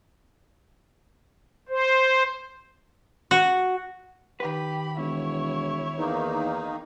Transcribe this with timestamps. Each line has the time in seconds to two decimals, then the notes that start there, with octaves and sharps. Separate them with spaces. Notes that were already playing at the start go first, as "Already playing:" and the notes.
1.69 C5
3.31 F#4
4.40 D#3 G4 B4 B5
4.98 E1 E4 C#5
5.98 E2 D#3 A#3 D#4